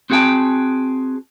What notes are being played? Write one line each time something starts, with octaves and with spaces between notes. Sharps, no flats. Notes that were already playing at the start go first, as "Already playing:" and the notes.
C4 F#4 G#4 F#5 G5 A5